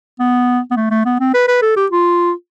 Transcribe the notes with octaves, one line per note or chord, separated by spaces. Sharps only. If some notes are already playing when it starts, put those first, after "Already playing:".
B3
B3
A3
A3
B3
C4
B4
B4
A4
G4
F4